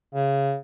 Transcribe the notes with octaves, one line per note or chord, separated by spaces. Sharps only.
C#3